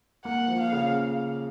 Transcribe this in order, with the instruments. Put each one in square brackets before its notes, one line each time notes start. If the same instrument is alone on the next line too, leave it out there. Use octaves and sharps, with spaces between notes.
[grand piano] A#3 [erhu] F#5
[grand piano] F3
[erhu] F5
[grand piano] C#3